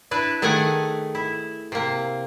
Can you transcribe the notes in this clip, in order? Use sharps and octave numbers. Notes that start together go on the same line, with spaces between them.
D4 E4 B4
D#3 A3 G#4 F#5 G#5
E4
C3 A#3